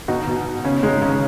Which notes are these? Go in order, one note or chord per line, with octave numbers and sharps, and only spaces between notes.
B2 D#4 F#4
B2
B2
C#3 C#4
G#3 D#4
C#3 C#4